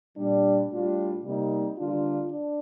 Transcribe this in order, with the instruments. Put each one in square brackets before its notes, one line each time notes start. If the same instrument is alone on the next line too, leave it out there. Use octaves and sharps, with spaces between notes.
[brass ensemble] A#2 G3 D4
A2 G3 D4 F4
C3 G3 A#3 D#4
D3 G3 A#3 D4 F4
D4